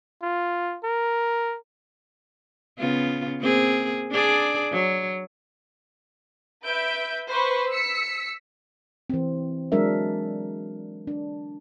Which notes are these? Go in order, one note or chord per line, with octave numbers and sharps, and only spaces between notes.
F4
A#4
C#3 B3 F4
A#3 C4 G#4
D4 G#4 D5
F#3
B4 E5 G6 D7
B4 C5 C#6
E6 B6 C#7
E3 C4
F#3 G#3 D4 A#4 E5
D4